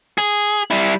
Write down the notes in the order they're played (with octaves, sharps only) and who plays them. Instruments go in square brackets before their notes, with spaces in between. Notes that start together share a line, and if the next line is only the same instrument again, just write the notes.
[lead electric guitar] G#4
G3 E4